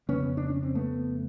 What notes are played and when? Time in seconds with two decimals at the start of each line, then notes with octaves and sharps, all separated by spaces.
0.08 F2 C#3 B3 C#4
0.37 D4
0.50 C#4
0.63 C4
0.75 A3 B3